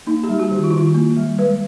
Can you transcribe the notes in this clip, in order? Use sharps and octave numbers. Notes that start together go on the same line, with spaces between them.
A#3 D#4
G4
G3
F#4
D#3
F#4
F4
D#3 E4
F4
A#3
G3
G#3 B4